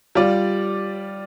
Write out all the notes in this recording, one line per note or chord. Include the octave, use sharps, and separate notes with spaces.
G3 F4 D5